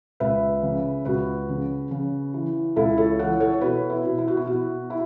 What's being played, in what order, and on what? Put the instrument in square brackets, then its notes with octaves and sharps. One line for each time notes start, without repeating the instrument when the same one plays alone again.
[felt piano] C#2 B4 E5
C#3
C#2 F#4 B4
C#3
C#3
E3
C#2 E4 A4
A4 C#5
E3 C#5 F#5
A4 C#5
C#5
B2 F#4 B4
E4
B2
E4
F#4
E4
B2 F#4
E4